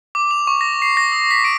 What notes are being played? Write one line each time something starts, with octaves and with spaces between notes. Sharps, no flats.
D6
F7
C#6
A#6
C7
A#6
D#6
B6
D7